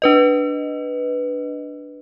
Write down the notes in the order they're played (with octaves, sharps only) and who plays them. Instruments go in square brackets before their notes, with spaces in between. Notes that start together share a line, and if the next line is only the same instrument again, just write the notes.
[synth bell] D4 B4 D#5